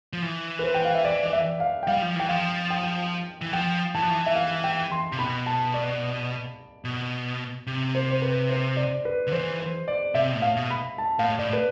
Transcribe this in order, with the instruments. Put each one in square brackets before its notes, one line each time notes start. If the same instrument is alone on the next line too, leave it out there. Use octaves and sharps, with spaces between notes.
[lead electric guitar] F3
E3
[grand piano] B4
C5
G5
F5
E5
D5
D5
E5
F5
G5
[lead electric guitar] G3 [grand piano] F5
[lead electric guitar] F3
[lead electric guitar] E3 [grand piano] G5
[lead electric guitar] F3 [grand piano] F5
[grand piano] G5
[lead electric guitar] E3
[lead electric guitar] F3 [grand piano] G5
[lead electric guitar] E3 [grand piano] A5
[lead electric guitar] F3
E3
[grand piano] E5
F5
G5
C6
[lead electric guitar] C3
[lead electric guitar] B2 [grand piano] B5
[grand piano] A5
D5
[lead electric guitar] B2
C3
[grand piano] C5
C5
B4
C5
D5
B4
[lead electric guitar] D3
[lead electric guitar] E3 [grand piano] C5
[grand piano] C5
D5
[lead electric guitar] C3 [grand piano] E5
[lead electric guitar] B2
A2
[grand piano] F5
[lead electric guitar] B2
[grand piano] B5
A5
[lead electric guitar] A2 [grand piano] F5
[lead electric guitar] A2 [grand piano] D5
[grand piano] B4